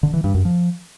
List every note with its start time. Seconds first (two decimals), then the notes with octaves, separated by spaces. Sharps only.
0.03 D3
0.14 E3
0.24 G2
0.34 F#2
0.45 F3